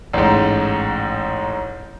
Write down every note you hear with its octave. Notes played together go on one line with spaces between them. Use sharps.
A1 G#2